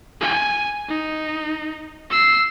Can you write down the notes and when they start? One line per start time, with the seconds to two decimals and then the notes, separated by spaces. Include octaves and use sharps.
0.21 G#5
0.89 D#4
2.10 E6 C7